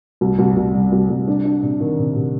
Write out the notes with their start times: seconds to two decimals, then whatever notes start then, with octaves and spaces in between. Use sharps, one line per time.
0.21 C2
0.39 C2
0.57 C2
0.74 G3
0.92 C2
1.09 C2
1.27 D4
1.45 D4
1.63 C3
1.80 D#3
1.99 C3
2.16 C3